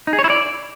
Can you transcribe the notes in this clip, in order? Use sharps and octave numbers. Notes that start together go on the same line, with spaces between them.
D#4
G#4
C#5
E4
D5